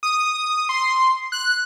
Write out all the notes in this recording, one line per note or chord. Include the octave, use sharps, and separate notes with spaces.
D#6
C6
F#6